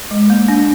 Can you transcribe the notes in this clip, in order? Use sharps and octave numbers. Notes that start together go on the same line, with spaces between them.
G#3
A#3
D4